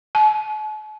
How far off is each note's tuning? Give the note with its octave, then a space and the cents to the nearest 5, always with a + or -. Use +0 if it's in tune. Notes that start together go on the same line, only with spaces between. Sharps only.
A5 -45